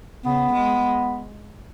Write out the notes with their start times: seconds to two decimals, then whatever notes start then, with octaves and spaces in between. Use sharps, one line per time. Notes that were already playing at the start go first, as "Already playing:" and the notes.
0.24 C#3 B3
0.53 G#3